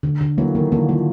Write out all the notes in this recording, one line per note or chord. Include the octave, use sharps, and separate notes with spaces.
D3
D3
E3 F#3 A#3
D#3 A#3
D3 E3 A#3
D#3 F3 A#3